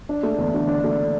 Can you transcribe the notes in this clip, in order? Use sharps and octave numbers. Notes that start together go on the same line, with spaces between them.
D4
A3
E2
D3
D4
A3